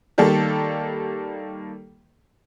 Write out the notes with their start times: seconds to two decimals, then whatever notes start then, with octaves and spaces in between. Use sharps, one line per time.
0.18 D#3 G3 A#3 A4